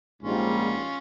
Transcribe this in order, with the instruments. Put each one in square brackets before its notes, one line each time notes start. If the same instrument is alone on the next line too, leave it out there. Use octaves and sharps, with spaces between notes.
[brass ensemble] A#1 G#2 G3 [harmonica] C#4 F4